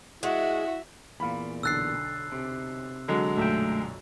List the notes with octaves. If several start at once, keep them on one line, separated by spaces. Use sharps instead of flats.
G#3 E4 F#4 E5 F#5
E2 A#2 F5 B5
B1 D3 E6 F#6 A6 C7
C3
D3 F#3 G#3
B1 F#2 A#2 A3 E5 G5